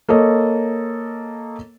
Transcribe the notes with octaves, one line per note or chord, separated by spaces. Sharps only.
A#3 A4 C#5 D#5